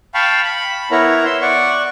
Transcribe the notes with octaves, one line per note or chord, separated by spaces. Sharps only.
F5 G5 A5 B5 C#6
B5
B3 E4 A#4 C#5 A#5
E5 C6
D5 F#5 C#6